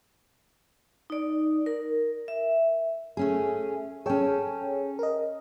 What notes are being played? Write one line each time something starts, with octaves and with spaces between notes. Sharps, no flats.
D#4 D5
A#4
E5
A3 C#4 G#4
C#4 G#4 A4 C#5 G5
A#4 D#5